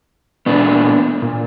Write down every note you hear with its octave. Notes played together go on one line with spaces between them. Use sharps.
A#2 B3 D4
A#2